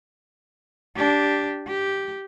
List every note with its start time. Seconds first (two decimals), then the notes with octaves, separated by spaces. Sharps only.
0.96 D4 G4
1.68 G4